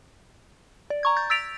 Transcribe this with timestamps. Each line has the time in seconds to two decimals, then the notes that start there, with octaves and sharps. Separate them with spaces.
0.90 D5
1.03 A#5 C#6 G#6
1.17 G6 A6
1.30 E6 A6 B6 D7 F7